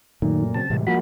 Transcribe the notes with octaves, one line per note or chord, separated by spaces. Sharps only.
F#2 A#2 D#3 F#3 A3
C#3 F#3 C4 A5
A2 C3 E3 G3 G#3
F3 A#3 F#4 B5